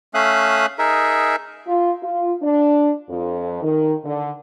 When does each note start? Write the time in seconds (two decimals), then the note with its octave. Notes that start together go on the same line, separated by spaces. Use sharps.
0.14 A3 C#4 E5 F5 D#6 F#6
0.79 D#4 G#4 A#4 E5
1.67 F4
2.03 F4
2.42 D4
3.09 F2
3.62 D#3
4.04 D3